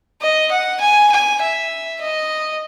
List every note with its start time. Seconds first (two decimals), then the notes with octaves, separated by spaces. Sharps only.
0.21 D#5
0.51 F#5
0.81 G#5
1.12 G#5
1.42 E5
2.01 D#5